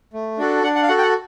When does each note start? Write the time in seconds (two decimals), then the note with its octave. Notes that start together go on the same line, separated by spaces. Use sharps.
0.13 A3
0.38 D4 F#4 A4
0.63 D4 F#5
0.76 F#5
0.82 F5
0.88 F#4 A4 F#5
0.98 G5
1.02 F#5